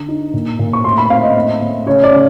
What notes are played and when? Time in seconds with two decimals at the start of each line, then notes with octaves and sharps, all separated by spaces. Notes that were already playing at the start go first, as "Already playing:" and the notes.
Already playing: D3
0.08 D#4
0.33 A#2
0.59 A#2
0.73 C#6
0.84 A2 C6
0.98 B5
1.10 C4 F5
1.23 D#5
1.36 A2
1.61 A2
1.86 C#3 C#5
2.03 D5
2.12 C#3